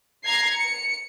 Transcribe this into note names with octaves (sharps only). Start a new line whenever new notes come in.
A#5 G#6 C7
C#7